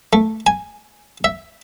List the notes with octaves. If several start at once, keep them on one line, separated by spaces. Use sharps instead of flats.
A3
G#5
E5